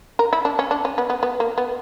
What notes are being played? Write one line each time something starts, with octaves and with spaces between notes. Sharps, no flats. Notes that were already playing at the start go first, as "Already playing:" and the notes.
A#4
E4
D4
C#4
D4
C#4
B3
B3
B3
A#3
B3